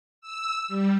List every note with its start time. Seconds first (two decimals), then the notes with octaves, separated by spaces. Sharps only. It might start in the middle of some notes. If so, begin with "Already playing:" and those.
0.21 E6
0.68 G3